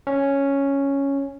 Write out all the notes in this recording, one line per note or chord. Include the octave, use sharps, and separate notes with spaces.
C#4